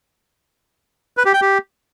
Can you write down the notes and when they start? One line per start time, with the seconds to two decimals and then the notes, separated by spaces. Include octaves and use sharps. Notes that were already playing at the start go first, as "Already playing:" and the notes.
1.17 B4
1.25 G4
1.33 G5
1.42 G4